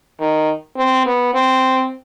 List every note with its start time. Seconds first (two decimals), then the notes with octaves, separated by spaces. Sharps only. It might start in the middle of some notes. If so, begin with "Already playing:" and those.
0.20 D#3
0.77 C4
1.06 B3
1.34 C4